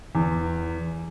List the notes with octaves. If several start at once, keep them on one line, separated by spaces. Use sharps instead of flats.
E2